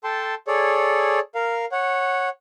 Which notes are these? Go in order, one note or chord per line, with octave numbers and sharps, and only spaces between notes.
A4 G5 A5 C6
G#4 A4 C#5 D5
A#4 F5
C#5 F#5